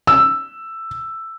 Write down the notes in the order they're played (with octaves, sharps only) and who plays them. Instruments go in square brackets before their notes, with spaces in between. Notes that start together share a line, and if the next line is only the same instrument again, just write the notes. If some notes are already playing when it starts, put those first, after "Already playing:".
[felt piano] E6